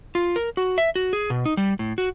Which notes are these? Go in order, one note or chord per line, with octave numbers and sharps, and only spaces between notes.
F4
A#4
F#4
E5
F#4
G#4
B2
D#4
G3
A2
F#4